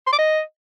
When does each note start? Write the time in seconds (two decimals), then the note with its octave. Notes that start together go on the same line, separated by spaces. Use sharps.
0.07 C6
0.13 D6
0.18 D#5